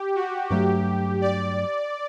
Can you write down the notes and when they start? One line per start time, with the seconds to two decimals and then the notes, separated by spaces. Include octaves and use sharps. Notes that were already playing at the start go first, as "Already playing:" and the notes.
Already playing: G4
0.15 F#4
0.50 G2 F#3 A3 G4
1.21 D5